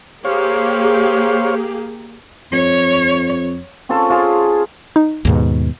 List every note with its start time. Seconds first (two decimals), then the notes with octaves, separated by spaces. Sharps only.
0.25 A#3 G4 G#4 C5 C#5 F5
2.52 F2 C#5
3.89 C4 C#4 F4 A4
4.10 C#4 F4 G#4 A5
4.96 D#4
5.25 D#2 G#2 B2